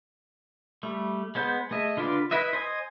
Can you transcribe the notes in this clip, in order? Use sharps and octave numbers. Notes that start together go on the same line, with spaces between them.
G3 A3
G#3 B3 C5 G6
A3 G#4 D#5 E5
D3 F4 B4 D5
E4 B4 D#5 E5
C5 D#5 G#5 D#6